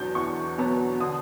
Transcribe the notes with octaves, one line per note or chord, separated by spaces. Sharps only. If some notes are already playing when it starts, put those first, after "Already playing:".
Already playing: E2 B2 F#3 B3 D4 G6
E2 C#6
B2 F#3 B3 D4
D3 D#6